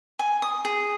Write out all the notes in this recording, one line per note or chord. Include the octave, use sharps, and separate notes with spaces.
G#5
D#6
G#4